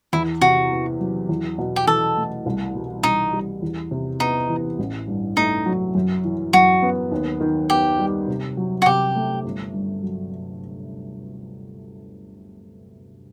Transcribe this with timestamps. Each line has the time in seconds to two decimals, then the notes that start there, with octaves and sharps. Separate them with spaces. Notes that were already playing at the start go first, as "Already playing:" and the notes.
0.13 E2 E4
0.41 C3 F#4
0.71 B3
1.00 F#3
1.29 E2
1.58 B2
1.76 G4
1.87 E2 A4
2.17 A3
2.46 C2
2.75 B2
3.03 C2 D#4
3.33 G3
3.62 E2
3.91 C3
4.20 B3 D#4
4.49 E3
4.79 A1
5.08 G2
5.37 A3 D#4
5.66 F#3
5.95 F#2
6.24 E3
6.53 F#2 F#4
6.83 B3
7.12 D#2
7.41 D#3
7.70 B3 G4
7.99 G3
8.28 C3
8.57 F#3
8.82 F#4
8.86 C3 G4
9.15 A3
9.45 G1
9.74 G2
10.03 F#3